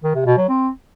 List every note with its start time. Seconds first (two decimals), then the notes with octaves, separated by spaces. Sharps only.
0.04 D#3
0.15 C3
0.26 B2
0.37 F#3
0.49 C4